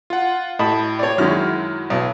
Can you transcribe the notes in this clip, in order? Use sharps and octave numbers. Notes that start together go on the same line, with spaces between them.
F4 F#5
A2 D#5 A5 B5
C#5 D5
F#2 D#3 F#3 G#3 E4 F6
B1